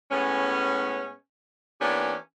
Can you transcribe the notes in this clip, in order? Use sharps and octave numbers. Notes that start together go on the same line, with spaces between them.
A2 G#3 B3 C#4
E3 A#3 B3 C#4 D4 G4